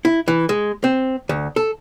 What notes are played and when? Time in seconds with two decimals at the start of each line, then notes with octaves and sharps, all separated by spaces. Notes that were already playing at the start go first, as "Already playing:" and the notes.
0.05 E4
0.28 E3
0.49 G#3
0.84 C4
1.29 D2
1.56 A4